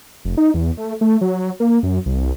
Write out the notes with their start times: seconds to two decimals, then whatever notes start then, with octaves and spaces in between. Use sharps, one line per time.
0.25 F1
0.37 D#4
0.54 E2
0.77 A3
1.01 A3
1.21 F#3
1.60 A#3
1.83 F#2
2.06 C2